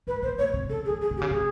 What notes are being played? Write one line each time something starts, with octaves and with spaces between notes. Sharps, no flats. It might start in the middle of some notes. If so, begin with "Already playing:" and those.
G#2 B4
A#2 C5
A#2 C#5
C3
C#3 A4
G#4
C#3
G#4
C3
G4
C#3
C3 G#4